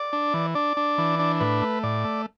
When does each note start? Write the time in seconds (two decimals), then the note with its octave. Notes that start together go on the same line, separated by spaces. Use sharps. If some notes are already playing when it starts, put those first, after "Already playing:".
Already playing: D5
0.13 D4
0.34 E3
0.55 D4 D5
0.77 D4
0.98 E3
1.19 D4
1.40 A2 B4
1.62 A3
1.83 A2 D5
2.05 A3